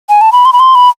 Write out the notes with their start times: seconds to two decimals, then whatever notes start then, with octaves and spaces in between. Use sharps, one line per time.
0.09 G#5
0.21 A5
0.32 B5
0.45 C6
0.53 B5
0.60 C6
0.75 B5